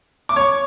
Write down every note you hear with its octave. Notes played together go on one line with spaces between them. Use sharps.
D6
C#5 C#6